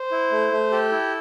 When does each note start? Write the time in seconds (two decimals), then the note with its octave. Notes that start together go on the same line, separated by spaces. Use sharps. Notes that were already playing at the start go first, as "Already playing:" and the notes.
Already playing: C5
0.12 E4
0.32 A3
0.52 A3
0.71 G4 A4
0.92 E4